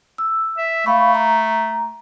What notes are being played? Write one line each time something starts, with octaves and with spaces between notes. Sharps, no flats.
E6
E5
A3 F5 B5 C#6
A#5